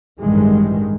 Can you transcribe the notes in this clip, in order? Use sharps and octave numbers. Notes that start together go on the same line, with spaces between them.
A1 G2 D#3 E3 G3 G#3